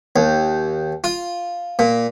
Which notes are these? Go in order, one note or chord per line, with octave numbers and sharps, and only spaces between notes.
D#2
F4
A#2